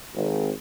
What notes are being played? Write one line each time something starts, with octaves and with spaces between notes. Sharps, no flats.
G#1